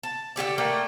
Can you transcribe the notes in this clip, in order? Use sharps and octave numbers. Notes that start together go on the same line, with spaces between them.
A5
D3 F4 G4 D5
A3 A#3 D5 G5